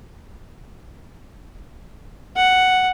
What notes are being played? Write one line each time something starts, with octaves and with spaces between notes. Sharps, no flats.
F#5